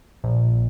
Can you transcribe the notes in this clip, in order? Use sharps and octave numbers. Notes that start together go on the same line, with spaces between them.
A#1